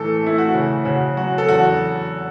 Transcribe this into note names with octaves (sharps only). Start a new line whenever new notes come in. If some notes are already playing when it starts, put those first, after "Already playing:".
Already playing: A2 E3 A4
A3 E4
F#4
C#3
C#3 F#4
F#3 F#4
A4
E2 F#4